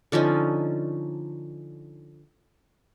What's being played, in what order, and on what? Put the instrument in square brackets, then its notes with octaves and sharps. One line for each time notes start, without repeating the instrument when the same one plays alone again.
[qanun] D3 F3 C#4 D#4